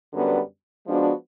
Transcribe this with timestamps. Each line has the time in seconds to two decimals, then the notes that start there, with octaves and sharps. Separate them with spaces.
0.13 F#2 D3 G3 B3
0.86 F3 G#3 B3 D4 F#4